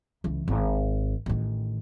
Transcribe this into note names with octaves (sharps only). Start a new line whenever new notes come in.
C#2 E3
G#1
A1 D#3